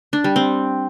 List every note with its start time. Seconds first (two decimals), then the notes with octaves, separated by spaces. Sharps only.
0.13 D4
0.24 G3
0.36 C4